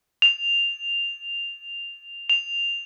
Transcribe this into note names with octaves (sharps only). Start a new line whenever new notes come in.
F7
F7